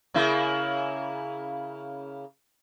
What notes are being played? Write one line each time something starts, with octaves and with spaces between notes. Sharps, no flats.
C#3 A#3 E4